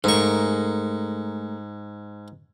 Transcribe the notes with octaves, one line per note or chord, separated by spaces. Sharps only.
G#2 A3 G#4 A#4 C#6